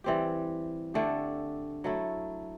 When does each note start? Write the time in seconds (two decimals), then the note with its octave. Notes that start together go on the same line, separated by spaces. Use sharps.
0.04 E3 G3 C4 G4
0.94 D3 A3 D4 G4
1.84 F#3 A3 E4